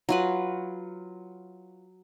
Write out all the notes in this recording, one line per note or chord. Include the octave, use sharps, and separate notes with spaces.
F#3 F4 B4